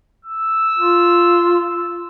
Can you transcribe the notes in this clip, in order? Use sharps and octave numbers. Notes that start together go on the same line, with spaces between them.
E6
F4